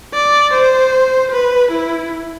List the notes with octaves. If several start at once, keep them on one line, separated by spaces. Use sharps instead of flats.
D5
C5
B4
E4